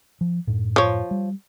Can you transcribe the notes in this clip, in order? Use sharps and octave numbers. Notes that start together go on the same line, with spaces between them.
F3
F#2 A2
F3 C#5
G3